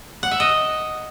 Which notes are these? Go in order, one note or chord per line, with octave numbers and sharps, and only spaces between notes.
F#5
E5
D#5